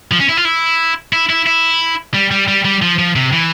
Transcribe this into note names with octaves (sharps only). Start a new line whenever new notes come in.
F3
C#4
E4
F4
E4
E4
E4
E4
G3
G3
G3
G3
F3
F3
C3
E3